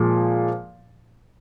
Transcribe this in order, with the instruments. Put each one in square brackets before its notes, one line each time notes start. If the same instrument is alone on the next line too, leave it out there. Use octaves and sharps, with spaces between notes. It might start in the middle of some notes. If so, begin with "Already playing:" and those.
Already playing: [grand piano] A#2 F3 G#3